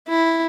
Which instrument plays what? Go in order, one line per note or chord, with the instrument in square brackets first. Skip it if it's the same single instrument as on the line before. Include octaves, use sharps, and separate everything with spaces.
[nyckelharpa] E4